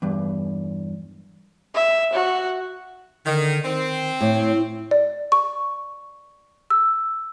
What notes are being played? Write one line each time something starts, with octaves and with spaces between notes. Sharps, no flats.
E2 G2
E5
F#4
D3 D#3
D#3 C4
A2 C#5
D5
C#6
E6